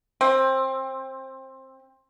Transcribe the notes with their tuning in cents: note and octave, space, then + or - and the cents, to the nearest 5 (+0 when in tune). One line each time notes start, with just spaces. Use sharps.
C4 +20